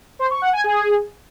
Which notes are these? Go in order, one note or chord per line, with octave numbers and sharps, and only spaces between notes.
C5
C#6
F#5
G#5
G#4